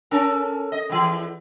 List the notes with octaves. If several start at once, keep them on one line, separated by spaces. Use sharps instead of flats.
C#4 A4 A#4
D#5
E2 E3